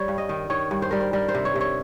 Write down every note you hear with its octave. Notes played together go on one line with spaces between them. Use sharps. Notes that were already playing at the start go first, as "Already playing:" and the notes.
Already playing: G3 C#5
G2
D#5
D#3
D#3 C#5
G2
C5
G3 A#4
C5
G3 A#4
C5
C3
C#5
C3
C#5